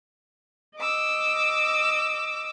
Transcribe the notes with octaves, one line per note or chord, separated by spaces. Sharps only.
D#5 D6 E6